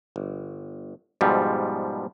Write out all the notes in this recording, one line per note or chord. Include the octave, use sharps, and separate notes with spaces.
G1
G#2 B2 F3 G3